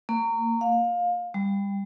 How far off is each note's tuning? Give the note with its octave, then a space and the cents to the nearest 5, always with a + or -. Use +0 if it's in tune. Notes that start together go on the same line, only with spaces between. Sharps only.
A#3 -25
F5 +20
G3 +15